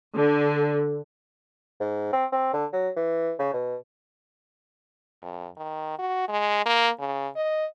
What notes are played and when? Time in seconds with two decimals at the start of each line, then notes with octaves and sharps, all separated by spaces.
0.14 D3
1.80 G#2
2.13 C4
2.32 C4
2.53 D3
2.73 F#3
2.96 E3
3.39 C#3
3.53 B2
5.22 F2
5.57 D#3
5.99 F#4
6.29 G#3
6.66 A#3
7.00 C#3
7.36 D#5